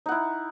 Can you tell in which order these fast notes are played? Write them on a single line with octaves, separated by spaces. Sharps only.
D#4 F#5 E4